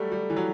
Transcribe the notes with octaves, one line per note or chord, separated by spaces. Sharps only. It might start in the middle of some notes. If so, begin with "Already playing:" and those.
Already playing: F#3 G3 A3
G3
E3
F#3